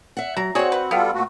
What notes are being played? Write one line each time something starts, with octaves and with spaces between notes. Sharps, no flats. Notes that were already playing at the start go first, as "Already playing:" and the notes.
E5 F#5
F#3 A#5
C4 F#4 G#4 C#5 D5 F#5
B4
G3 B3 F4 A4 F5 G5 B5
A#2 A3 F#4